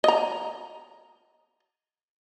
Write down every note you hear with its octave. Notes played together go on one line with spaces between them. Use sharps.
D#5 A#5